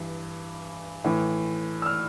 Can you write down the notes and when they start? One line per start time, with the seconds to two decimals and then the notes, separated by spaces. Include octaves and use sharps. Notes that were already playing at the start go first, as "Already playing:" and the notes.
Already playing: G2 E3
1.04 A2 E3
1.82 E6
1.86 F6